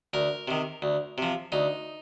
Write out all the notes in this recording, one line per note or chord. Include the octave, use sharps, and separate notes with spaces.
D2 A#4
C3 D#3
D2
C3 F3
D2 D#4